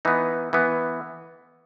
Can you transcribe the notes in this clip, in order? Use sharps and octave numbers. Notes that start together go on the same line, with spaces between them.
E3 B3 D#4
E3 B3